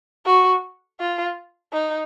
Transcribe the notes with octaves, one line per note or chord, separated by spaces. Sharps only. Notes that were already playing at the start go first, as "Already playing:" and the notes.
F#4
F4
D#4